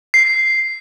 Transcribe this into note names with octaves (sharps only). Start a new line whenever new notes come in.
C7